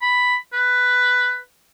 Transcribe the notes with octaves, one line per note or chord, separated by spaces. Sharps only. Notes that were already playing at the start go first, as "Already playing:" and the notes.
B5
B4